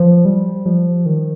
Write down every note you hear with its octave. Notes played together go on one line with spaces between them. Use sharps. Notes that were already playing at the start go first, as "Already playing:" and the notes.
Already playing: F3
G3
F3
D#3